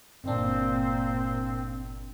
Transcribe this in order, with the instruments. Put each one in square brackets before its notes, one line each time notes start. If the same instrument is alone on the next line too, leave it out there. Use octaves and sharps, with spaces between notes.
[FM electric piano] G1 D4 [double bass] A#2 [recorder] C4